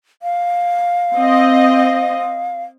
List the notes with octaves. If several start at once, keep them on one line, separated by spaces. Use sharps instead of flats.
F5
C4 D#5